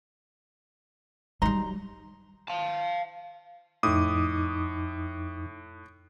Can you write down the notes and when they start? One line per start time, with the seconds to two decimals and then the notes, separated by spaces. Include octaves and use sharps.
1.42 F#3 G3 D#4 A#5 C6
2.48 F5 A5
3.83 F2 A2 D#4 D6 D#6